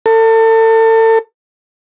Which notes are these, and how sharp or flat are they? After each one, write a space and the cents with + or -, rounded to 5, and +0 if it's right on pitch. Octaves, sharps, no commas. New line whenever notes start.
A4 +35